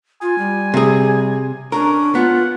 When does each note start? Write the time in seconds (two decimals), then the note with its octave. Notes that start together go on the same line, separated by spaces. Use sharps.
0.22 F4 G#5
0.38 G3
0.74 C3 G#4
1.72 C#4 D4 A#4
2.15 B3 F4 F#5